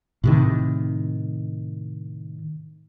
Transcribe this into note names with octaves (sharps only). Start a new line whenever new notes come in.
A2 C3 D#3